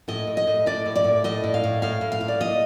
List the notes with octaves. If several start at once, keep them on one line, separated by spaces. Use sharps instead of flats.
A2 D#5
A2
D#5
A2
A2 D5
A2
D5
A2
A2 D#5
A2
F5
A2
A2 F5
A2
F5
A2
D5
A#2 D#5